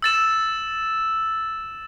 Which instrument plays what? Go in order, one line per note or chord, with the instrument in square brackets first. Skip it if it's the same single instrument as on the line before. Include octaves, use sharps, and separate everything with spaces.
[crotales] E6 A6 E7